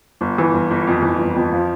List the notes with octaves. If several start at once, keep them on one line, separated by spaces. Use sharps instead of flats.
G1
E3
G1
G1
F2
E3
G1
F2
F3